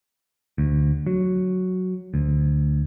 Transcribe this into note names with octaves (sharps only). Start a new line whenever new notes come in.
D2
F#3
D2